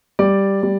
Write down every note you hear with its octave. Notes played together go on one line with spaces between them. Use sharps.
G3 D5
G3